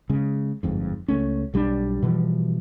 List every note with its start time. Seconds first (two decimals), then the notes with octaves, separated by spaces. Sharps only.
0.10 C#3 G#3
0.63 G1 F2 G#2
1.08 C#2 A3 C#4
1.54 B1 G3 C4 D4
2.03 B2 E3 F3 G3